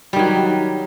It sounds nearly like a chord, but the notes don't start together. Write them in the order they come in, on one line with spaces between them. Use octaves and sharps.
G3 D#3 F#3